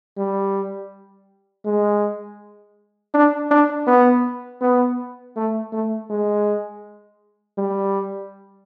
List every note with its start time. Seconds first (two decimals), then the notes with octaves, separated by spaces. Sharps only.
0.17 G3
1.65 G#3
3.14 D4
3.51 D4
3.87 B3
4.61 B3
5.36 A3
5.73 A3
6.10 G#3
7.58 G3